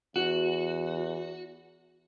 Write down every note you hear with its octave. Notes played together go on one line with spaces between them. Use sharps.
E2 F#4